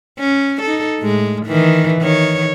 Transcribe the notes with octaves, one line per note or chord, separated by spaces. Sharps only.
C#4
D#4 A4
A2 G#3
D#3 E3
D#3 C#5